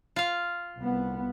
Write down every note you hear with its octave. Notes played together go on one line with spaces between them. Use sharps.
F4 F5
C2 B3